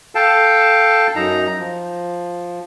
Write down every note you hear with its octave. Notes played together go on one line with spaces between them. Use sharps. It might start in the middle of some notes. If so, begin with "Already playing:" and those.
A4 F5 G5 A5
F#2 D#4 A#5
F3